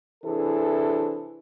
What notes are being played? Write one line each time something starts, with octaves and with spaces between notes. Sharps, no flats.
C3 E3 D4 G#4 A4 B4